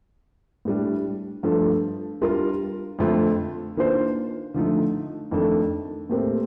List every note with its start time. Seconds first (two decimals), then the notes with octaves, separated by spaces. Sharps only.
0.65 A2 G3 D4
1.43 G2 F3 A3 D4 A4
2.22 G3 D4 F4 A#4
2.99 F2 D3 A3 C4 F4
3.77 D#3 A#3 D4 F4 C5
4.54 D3 F3 A3 D#4
5.31 F2 D#3 A3 D4 A4
6.09 A#2 A3 C4 G4 A#4